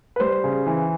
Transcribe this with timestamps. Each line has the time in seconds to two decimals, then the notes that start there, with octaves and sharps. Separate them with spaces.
0.16 B4
0.20 G3 C5
0.44 C#3
0.66 E3